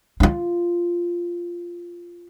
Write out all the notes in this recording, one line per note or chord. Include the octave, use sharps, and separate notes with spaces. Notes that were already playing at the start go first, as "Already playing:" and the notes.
D#4 F4